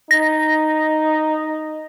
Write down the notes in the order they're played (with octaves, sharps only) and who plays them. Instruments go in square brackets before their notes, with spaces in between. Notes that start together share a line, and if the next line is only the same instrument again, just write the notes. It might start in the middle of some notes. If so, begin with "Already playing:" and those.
[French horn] D#4 [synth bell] A#6